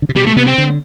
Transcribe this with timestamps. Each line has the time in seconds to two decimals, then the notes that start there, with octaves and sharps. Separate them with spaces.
0.02 D3
0.09 C3
0.16 B2 G3
0.27 A3
0.36 C3 B3
0.47 C4
0.58 D3